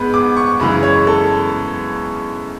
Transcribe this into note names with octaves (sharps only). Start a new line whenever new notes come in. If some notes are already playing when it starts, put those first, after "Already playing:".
Already playing: G#2 G#3 B3 B5
D6
C#6
F#2 C#3 E3 G#3 B5
C#5
A4